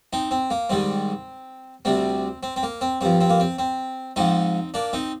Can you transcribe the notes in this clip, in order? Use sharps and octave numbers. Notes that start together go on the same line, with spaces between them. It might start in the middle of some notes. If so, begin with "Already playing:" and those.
C4 D#4
C4
A#3
G#2 D#3 G3 C4
D2 C3 G3 C4
C4
C4
A#3
C4
G2 F3 C4
C4
A#3
C4
C4
G#2 F3 C4 D#4
A#3 D4
C4 D#4